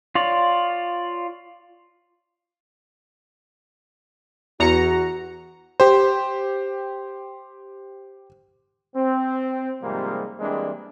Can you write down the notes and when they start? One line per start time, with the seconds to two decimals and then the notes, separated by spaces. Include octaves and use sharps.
0.15 F4 C#5 D5
4.60 E2 F#4 A#5 C#7
5.80 G4 C5
8.95 C4
9.82 G#2 C3 F3 G3 G#3 A#3
10.40 E3 G3 G#3 A#3 C4 D4